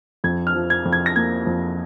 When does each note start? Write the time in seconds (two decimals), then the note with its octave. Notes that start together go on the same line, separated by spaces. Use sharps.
0.24 F2 G#6
0.47 F6
0.55 F3
0.70 G#6
0.85 F2
0.93 G#6
1.06 A#6
1.16 A#3 G#6
1.47 F2